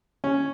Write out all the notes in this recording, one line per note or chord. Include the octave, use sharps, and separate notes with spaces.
C#4